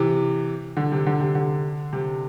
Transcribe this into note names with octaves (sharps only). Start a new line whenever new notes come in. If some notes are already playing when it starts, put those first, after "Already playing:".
Already playing: C3 E3
D3
C3
D3
C3
D3
C3